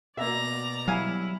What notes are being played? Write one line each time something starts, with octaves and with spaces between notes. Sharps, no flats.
B2 A#3 D5 E5 A#5
F#3 G3 E4 F5 G#5